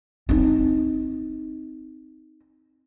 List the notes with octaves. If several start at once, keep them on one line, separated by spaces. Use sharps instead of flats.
C4 D#4